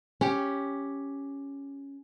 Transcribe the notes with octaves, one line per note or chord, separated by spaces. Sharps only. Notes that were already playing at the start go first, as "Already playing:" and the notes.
C#4 G4